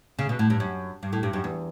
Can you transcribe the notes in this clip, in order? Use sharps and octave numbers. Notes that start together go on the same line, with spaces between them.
C#3
B2
A2
G2
F#2
G2
A2
G2
F#2
E2